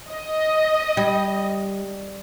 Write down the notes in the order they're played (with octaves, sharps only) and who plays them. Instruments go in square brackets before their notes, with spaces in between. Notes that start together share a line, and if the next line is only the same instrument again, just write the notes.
[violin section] D#5
[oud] G3